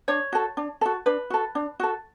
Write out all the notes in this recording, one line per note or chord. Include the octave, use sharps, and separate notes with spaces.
D4 C#5
F#4 A4
D4
F#4 A4
D4 B4
F#4 A4
D4
F#4 A4